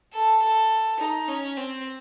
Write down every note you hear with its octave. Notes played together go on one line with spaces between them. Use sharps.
A4
A4
D#4
C#4
C4